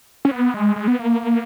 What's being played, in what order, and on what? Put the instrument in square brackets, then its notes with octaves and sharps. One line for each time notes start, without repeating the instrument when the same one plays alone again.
[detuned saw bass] C#4
B3
G#3
G#3
B3
A#3